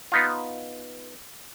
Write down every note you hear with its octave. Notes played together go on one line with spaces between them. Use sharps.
B3 D#4 F4